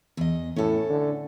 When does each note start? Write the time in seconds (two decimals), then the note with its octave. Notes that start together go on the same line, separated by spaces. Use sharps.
0.17 E2 D#5
0.56 A2 C#4 A4
0.89 D3